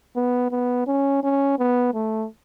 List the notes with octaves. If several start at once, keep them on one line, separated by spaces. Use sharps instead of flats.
B3
B3
C#4
C#4
B3
A3